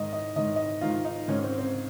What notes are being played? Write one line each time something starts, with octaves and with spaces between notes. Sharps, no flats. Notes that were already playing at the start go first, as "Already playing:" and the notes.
Already playing: G#2 D#3 D#5
D#5
G#2 D#3 D#5
D#5
G#2 D#3 F4
D#4
G#2 D#3 C#4
C4
C4